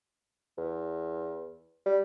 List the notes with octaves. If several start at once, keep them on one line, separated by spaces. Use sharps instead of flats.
E2
G3